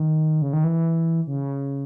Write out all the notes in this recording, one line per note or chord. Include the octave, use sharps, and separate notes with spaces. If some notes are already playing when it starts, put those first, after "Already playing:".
Already playing: D#3
C#3
D#3
E3
C#3